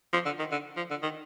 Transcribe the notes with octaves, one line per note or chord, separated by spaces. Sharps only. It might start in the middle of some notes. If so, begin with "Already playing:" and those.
F3
D3
D#3
D3
F3
D3
D#3